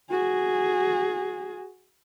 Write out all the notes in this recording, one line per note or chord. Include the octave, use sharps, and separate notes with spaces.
F#4 G#4